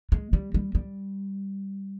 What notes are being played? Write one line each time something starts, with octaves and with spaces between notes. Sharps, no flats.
G#3
G3
G3
G3